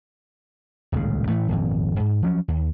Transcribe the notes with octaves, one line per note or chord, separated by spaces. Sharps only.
D#1 C#2 A2 C#3
A2 E3 A3
D#1 G#1 F2
G#2
F3 F#3 B3 C#4
D#2